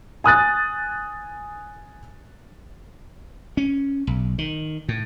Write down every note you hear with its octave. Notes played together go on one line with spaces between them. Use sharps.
G#5 D#6 F#6 A6
C#4
B1
D#3
A2